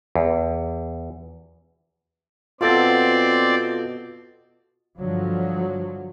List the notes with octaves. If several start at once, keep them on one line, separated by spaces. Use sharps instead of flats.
E2
B2 C4 F4 A4 D5 D6 A6
G2 D3 F3 F#3